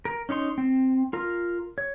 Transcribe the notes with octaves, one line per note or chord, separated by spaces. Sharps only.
A#4
C#4 D#4 C#5 C6
C4
F4 A#4
C#5